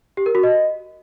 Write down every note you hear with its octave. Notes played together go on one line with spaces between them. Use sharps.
G4
A#4
F#4
D#5